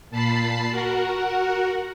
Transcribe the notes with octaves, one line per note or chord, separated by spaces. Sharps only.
A#2 A5 B5 C7
F#4 A#4 F#5